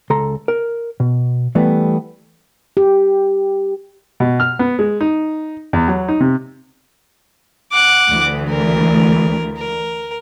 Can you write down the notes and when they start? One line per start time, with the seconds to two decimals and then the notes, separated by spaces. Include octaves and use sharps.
0.10 C#2 A4 A#5 C6
0.48 A#4
1.00 B2
1.55 E3 G3 A3 B3
2.77 G4
4.20 B2
4.40 F6
4.59 B3
4.79 G#3
5.01 D#4
5.73 E2
5.88 F#3
6.08 D#4
6.20 C3
7.72 F#5 D6
8.09 D2 E3
8.49 A#4
9.57 A#4